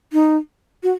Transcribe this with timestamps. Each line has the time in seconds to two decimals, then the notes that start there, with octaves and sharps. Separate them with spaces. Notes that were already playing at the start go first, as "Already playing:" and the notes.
0.13 D#4
0.83 F#4